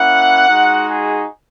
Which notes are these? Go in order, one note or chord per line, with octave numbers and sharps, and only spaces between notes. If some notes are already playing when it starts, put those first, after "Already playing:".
Already playing: A#3 C#4 E4 F#5
G#3 D#4 F#4
G#4